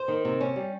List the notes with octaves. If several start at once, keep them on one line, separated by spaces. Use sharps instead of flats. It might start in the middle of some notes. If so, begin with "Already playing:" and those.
Already playing: C5
D#3
C3
C#4
G3